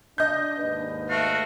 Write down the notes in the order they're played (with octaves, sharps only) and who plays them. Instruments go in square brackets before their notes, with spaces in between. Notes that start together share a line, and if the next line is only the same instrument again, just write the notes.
[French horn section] D4 [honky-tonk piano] D#5 G6
[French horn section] D#2 G#2 B4
[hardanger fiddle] A3 F5 [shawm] F#4